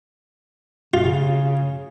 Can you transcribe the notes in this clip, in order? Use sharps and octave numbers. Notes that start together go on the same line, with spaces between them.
C#3 F4